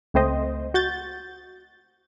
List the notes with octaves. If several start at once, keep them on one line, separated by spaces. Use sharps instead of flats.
C#2 A3 C4 C5 D#5
F#4 G6 A6